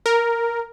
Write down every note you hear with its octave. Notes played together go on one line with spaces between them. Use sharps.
A#4